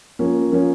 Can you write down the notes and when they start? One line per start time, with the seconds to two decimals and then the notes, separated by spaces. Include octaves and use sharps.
0.19 F3 A#3 C#4
0.52 F3 A#3 C#4